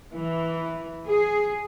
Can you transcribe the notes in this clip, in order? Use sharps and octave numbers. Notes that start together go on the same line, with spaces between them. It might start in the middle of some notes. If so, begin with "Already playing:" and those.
E3
G#4